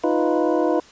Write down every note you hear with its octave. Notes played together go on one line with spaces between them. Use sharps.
D#4 F4 B4